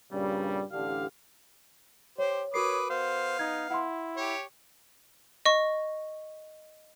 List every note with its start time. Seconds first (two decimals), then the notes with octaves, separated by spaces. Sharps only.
0.12 G2 A#2 C#3 G3
0.71 A1 D3 D4 G4 F5
2.18 G4 C5 C#5
2.54 F#4 A#4 B4 C#5 D6 D#6 C7
2.90 B3 C5 F5
3.39 D#4 G#6
3.70 E4 F#5 C6
4.17 G4 C#5
5.46 D#5 C#6